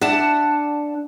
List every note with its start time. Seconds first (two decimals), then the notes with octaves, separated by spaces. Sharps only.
0.01 D4 D5 E5 F#5 A5